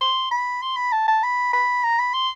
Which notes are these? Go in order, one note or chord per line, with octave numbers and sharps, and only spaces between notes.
C6
B5
C6
B5
A5
A5
B5
B5
A#5
B5
C6